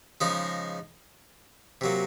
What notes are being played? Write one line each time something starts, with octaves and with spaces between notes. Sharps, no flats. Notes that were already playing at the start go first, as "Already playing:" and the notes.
C#3 F3 G#3 D#4 G#4
C3 F#3 A#3